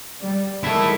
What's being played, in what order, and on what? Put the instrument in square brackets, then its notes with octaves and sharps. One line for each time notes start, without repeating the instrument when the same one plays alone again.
[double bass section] G3
[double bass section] D#3 E3 G#3 [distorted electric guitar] E4 A4